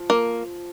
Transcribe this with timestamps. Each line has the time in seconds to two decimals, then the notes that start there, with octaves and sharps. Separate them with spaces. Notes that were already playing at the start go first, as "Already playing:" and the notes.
Already playing: F3
0.10 A#3